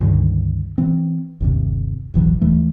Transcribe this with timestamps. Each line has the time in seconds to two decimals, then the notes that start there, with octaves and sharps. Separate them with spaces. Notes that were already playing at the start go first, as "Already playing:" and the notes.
0.01 C#2 G2 D3 D#3
0.78 E3 C4
1.40 G1 D#2 C3
2.14 E1 A1 E3 F#3
2.41 D#2 E3 A3